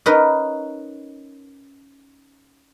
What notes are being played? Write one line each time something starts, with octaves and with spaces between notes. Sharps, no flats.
C#4 D#4 A#4 B4